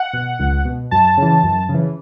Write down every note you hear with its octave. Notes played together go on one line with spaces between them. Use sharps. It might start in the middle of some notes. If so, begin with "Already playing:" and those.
Already playing: F#5
B2
C#2
B2
F#2 A5
C#3 E3
F#2
C#3
E3